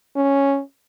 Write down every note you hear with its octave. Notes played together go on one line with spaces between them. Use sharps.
C#4